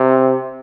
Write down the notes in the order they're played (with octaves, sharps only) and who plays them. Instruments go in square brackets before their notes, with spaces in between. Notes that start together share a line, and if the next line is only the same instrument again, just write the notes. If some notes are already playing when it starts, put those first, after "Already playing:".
Already playing: [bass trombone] C3